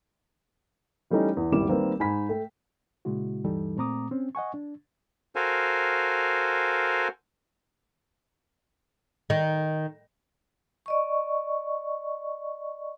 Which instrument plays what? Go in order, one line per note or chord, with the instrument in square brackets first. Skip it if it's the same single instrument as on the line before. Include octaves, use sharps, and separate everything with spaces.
[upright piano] E3 G3 A3 C#4 D#4
E2
D#1 G#1 G3 E4 D6 E7
D#3 G3 A#3 C4 B4
G#2 G#5 B5 B6
A3 G5
[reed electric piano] A#2 C#3 G#3 E4 F#4
D2 G2 E3 G3 D#4 A4
A#2 A3 C4 A#5 D6 D#6
C4 C#4
D#5 F#5 G#5 C#6
D4
[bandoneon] F#4 A4 A#4 C5 F5 G#5
[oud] D#3
[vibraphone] D5 D#5 C#6